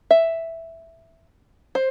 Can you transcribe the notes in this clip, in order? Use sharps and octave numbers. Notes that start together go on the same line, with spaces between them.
E5
C5